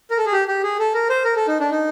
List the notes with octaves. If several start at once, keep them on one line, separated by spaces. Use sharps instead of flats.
A#4
A4
G#4
G4
G4
G#4
A4
A#4
C5
A#4
A4
D#4
D4
D#4